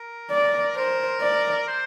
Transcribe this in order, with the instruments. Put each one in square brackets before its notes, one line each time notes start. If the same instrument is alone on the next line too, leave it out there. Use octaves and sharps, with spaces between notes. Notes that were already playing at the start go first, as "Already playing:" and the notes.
Already playing: [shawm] A#4
[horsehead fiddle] D5
[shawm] A#4 [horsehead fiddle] C5
[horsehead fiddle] D5
[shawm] C5